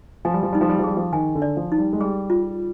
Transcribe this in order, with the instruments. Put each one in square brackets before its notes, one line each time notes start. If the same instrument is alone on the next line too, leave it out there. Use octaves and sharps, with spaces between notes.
[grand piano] F3 [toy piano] G#5
[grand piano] G3
F3
[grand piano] G3 [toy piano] D#4
[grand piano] F3
G3
F3
[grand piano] G3 [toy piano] G#4
[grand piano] F3
[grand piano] D#3 [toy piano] G#5
[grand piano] D3
[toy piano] D5
[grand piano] F3
[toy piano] D#4
[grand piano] G3
G#3
[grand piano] G3 [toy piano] G#4
[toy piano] F4